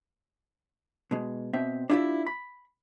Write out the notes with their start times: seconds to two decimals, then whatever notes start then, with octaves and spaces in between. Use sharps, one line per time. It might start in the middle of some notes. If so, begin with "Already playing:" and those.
1.11 B2 G#3
1.53 B2 C4 E5
1.89 D4 E4 F4 G4 C#5 E5
2.27 B5